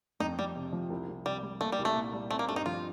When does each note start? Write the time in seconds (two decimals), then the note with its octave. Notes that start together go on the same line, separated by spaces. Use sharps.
0.20 F2 D#4
0.38 F2 G3
0.56 C3
0.72 F3
0.90 C2
1.08 C2
1.26 C3 G3
1.43 G3
1.61 A3 A#3
1.72 G3
1.79 C2
1.85 A3
1.96 A#2
2.13 G3
2.30 A3 C4
2.39 A#3
2.49 G2 A3
2.56 D#4
2.66 F3 F4